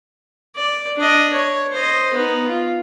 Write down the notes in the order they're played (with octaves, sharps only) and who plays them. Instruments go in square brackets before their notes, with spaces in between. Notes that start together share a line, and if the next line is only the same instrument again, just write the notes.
[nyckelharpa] D5
D4 D#5
C#5
C5 D#5
B3 D#4
F4